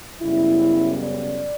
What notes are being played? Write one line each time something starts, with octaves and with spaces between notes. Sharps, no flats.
F#2 C#3 G3 B3 E4
D5